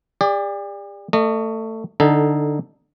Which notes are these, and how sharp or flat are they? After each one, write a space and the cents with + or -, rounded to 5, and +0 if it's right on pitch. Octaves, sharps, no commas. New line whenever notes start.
G4 +45 D5 +0
A3 +20 D#5 -30
D3 +15 D#4 +5 A4 +0